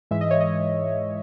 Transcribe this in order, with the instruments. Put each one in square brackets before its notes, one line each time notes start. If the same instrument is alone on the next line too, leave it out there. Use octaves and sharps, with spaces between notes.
[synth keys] G#2 E3 G#3 E5
D#5
C#5
D#5